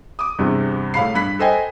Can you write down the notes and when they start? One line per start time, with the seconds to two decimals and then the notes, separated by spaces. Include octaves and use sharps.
0.19 D6 D#6
0.39 E2 G2 C3
0.94 A2 F5 B5 C7
1.15 G2 B5 F#6 B6
1.39 A4 C5 D#5 G5 G#5